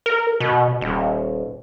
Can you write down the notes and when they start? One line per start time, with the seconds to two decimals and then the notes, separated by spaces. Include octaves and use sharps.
0.06 A#4
0.40 B2
0.81 D#1